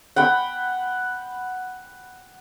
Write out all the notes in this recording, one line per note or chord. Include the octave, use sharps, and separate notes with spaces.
F#5 G5 B5